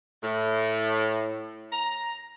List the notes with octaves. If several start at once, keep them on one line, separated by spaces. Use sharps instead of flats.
A2
A#5